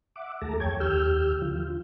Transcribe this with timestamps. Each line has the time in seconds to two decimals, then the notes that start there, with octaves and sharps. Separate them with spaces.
0.16 E5 F#5 D6
0.41 D#2 A3 G#4 A4 A5 A#5
0.60 F2 C#5 G5 G#6
0.80 D#2 G4 E6 F6 G6
1.41 D3 F3 F4
1.55 F4